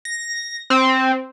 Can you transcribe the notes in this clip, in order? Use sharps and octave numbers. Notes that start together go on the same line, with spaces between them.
A#6
C4